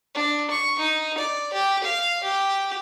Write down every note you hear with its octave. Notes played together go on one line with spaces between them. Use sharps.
D4
C#6
D#4
D5
G4
F5
G4